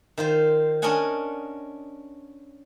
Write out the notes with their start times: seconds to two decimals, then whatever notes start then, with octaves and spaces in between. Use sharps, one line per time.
0.18 D#3 F4 C5
0.82 C#4 D4 A#4 D#5 F#5 G#5